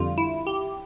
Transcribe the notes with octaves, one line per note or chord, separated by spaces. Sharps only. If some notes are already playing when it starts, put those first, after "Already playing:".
Already playing: F2 D3 G3 F4
E4
G4